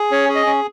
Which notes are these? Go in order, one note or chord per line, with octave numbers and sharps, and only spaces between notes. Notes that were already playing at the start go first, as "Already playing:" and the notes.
Already playing: G#4
C#4 C#5
G#4
D#5
C#4